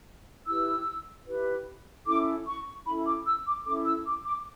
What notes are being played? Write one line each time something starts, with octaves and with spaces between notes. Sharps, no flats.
E4 G4 B4 E6
E4 G4 B4
C#4 E4 A4 D6
C#6
C#4 E4 A4 B5
D6
E6
D6
C#4 E4 A4 D6
E6
D6
D6